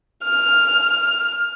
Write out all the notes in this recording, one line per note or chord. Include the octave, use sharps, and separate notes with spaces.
F6